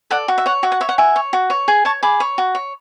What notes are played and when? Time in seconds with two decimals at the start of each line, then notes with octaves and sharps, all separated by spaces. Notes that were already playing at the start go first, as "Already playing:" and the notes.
0.11 A4 D5 F#5
0.28 F#4
0.38 E5
0.46 C#5 F#5
0.63 F#4 E5
0.72 F#5
0.81 C#5 E5
0.89 F#5
0.98 F#4 E5 G#5
1.16 C#5
1.33 F#4
1.50 C#5
1.68 G#4
1.85 C#5 A5 C#6
2.03 G#4 B5 D6
2.20 C#5
2.38 F#4
2.55 C#5